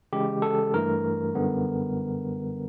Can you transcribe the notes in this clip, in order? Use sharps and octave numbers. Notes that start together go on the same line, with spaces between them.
C#3 E3 G#3 G4
A4
G2 E3 A3 A#4
F#2 D3 G3 B3